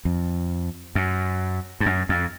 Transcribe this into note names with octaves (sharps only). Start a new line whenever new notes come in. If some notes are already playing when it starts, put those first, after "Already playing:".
F2
F#2
G2
F#2
F2